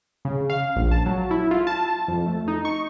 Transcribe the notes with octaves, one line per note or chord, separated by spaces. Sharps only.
C#3
F5
A#1
A5
F#3
E4
F4
A5
F2
A3
D#4
C#6